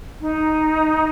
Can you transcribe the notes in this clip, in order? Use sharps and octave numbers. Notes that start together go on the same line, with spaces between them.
D#4